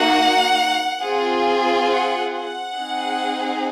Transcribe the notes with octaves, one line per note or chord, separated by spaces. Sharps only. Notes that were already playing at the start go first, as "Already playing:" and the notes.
Already playing: A#3 D#4 F#4 F#5
C4 F4 G#4
F#5
F#5
C4 D#4 G#4